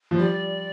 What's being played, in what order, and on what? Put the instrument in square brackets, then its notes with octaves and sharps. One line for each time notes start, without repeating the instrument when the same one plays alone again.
[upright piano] F3
[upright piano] G3 [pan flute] D5